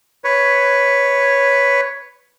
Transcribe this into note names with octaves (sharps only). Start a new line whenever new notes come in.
B4 C#5